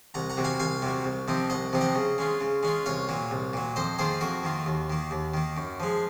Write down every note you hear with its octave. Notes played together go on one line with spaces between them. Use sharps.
C2 F#5 A#5
F#5 A#5
C3 F#3
F5 G#5
C2 F5 G#5
C3 F#3
C2
C3 F3 C4 D#4
C2 D#5 F#5
C3 F3 C4 D#4
D#5 F#5
C#3
G#3 C#4 F4
C#3
G#3 C#4 F4
C2 C#5 F5
A#2 F#3
C2
A#2 F#3
F2 C5 D#5
D#3 A#3 F4 G#4 C5
F2 F#4 A#4
D#3 A#3 F4
D#2
D#3 A#3
D#2
D#3 A#3
F#2
F3 G#3